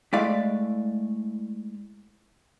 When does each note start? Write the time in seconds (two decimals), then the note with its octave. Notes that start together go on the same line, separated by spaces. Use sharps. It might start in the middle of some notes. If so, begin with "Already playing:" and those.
0.13 G#3 A3 E4 D5 F5